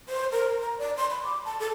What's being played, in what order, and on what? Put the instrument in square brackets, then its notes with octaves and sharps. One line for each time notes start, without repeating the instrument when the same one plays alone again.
[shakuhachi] C5
A#4
A#5
D5
C6
B5
D6
A5
A4